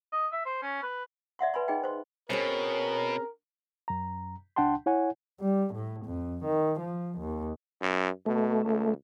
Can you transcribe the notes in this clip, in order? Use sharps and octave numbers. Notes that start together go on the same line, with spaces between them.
D#5
E5
C5
C#4
B4
D5 E5 F#5 C6
B4 G#5 B5 C6
D#4 G#4 D#5 G5
C5 C6
B2 C4 C#4 G#4 A#4 C#5
F#2 A#5
C#2 D4 F#5 G5 A5 C6
E4 C#5 F#5 G#5
G3
A2
F2
D#3
F3
D#2
F#2
B2 A3
C#2